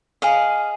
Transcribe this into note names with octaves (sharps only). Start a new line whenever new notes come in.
G#4 D#5 F5